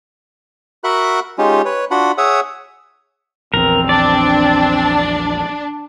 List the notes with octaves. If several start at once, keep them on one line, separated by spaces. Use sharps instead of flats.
F#4 A#4 E5 F#5 B5 F#6
G#3 C#4 D#4 F4 G4
B4 C#5
D4 F4 F#4 F#5 B5
G#4 C#5 E5 F#5 D#6 E6
A#1 E2 C4 A#4
D4 D5